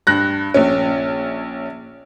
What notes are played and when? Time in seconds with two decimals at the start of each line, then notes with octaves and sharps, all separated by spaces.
0.07 G2 F#6 A#6
0.54 A#1 C#4